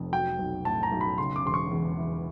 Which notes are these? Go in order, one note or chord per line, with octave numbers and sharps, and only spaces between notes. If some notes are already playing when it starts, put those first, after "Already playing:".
Already playing: F1 F2
F#3 G5
B1
A2 A5
A#5
B1
B5
C#3 C6
D6
E1 C6
C#6
E2
E3